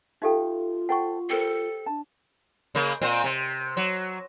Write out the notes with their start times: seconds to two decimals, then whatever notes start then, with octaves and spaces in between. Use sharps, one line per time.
0.22 D#4 F4 G4 A4 E5 F5 G5
0.89 A4 C5 F#5 G5 C#6
1.30 G4 A4 A#4 C5
1.86 D4 A5
2.75 C#3 A#3
3.02 A#2 C4
3.24 C3
3.77 F#3